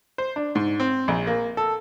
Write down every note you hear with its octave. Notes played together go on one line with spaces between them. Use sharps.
C5
D4
G#2
C4
A#1
A#3
A4